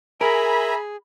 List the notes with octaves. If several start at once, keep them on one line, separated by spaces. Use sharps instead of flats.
G#4 A#4 E5 G#5 A#5 B5